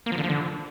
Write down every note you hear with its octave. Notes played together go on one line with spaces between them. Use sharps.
A#3
F3
D3
F3
D3